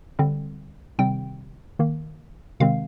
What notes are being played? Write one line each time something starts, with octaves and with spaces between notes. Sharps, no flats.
D3 G3 C4
C3 D#3 G3 C4 G5
D#3 A#3
C3 D#3 G#3 C4 F5